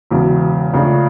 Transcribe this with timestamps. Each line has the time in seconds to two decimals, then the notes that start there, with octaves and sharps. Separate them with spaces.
0.11 E1 E2 C#3 F#3
0.73 C#2 C#3 F3 A3 D4